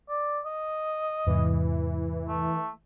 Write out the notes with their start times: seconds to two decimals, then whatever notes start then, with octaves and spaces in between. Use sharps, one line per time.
0.09 D5
0.46 D#5
1.27 E2 G#2 C3 E3
2.28 A3